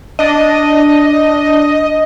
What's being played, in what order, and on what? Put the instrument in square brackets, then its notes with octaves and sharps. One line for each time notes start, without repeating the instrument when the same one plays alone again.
[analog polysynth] D4 [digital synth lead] D#5